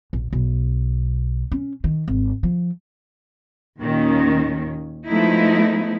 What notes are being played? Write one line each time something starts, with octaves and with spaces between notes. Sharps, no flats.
A#1
B1
C#4
D#3
G#1
F3
D#2 A#2 D#3 C#4
F3 G#3 A3 B3 D#4 E4